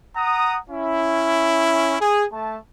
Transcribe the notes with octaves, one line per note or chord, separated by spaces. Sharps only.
F#5 A#5 D#6
C#4 E4
G#4
A3 A5